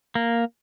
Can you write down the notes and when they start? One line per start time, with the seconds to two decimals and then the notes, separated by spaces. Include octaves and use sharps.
0.15 A#3